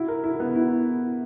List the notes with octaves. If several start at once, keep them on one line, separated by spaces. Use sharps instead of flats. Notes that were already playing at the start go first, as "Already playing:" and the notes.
Already playing: E4 F#4
A#4
E4
B3
E4